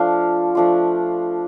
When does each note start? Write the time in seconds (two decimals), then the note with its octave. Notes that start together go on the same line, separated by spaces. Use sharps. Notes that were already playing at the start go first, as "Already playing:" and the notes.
Already playing: F3 A3 D4 F4 F5
0.55 F3 A3 D4 F4